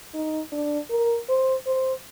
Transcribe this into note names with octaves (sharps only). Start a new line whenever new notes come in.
D#4
D4
A#4
C5
C5